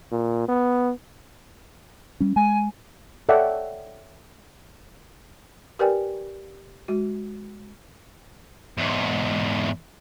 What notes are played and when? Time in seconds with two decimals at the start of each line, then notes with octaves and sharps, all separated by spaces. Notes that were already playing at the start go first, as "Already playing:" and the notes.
0.12 A#2
0.49 B3
2.20 G3 C#4
2.36 G#3 G#5
3.29 A4 C#5 D5 E5 F#5 G5
5.79 G4 A#4 B4 D5 G5 G#5
6.88 G#3 F#4
8.78 E2 G#2